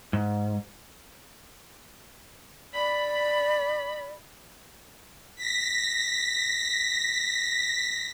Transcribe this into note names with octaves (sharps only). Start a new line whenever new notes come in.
G#2
D5 B5
A#6 B6